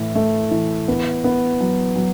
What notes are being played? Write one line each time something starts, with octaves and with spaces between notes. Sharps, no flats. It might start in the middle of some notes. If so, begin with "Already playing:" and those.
Already playing: A2 E3
A3
E3
B3
B3
F#3
F#3